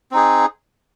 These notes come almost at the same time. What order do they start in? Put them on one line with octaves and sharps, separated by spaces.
C4 D#4 G#4